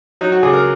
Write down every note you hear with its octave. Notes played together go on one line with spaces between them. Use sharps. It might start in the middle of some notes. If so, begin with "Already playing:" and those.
F#3 D#4
F#4
C#2 G#4
A#4